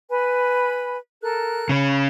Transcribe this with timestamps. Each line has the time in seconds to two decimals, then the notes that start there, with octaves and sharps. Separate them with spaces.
0.10 B4 G#5 B5
1.22 A4 A#4 F#6
1.69 C#3 C#4 B5